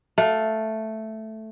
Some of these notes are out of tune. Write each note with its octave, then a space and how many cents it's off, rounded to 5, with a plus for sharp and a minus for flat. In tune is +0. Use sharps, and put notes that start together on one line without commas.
A3 +0 F5 +20